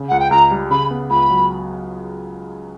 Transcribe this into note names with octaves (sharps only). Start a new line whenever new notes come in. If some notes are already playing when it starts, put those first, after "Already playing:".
Already playing: C#3
C#2 F#5
G5
C#2 A#5
G3
C#3 B5
B3
C#2 B5
F#3